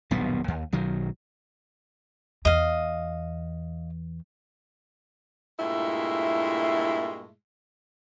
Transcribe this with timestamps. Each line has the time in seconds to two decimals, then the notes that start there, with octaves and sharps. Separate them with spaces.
0.11 D#1 B1 G2 B3
0.48 D#2
0.72 B1 D#3 F#3
2.45 E2 D#5 F5
5.59 G2 A#2 G#3 A3 E4